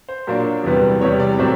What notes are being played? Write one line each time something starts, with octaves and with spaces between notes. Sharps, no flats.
C5
A#2 F#3 A#3 D4
E2 C3 E3 G3 B3
E2 C3 E3 G3 B3 C#5
D5
A2 F#3 A3 C4